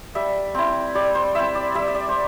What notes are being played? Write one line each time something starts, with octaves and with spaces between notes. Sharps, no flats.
G3 E5
C4 E4
G3 D5
C5
C4 E4 E5
D5
G3 E5
E5
D5
C5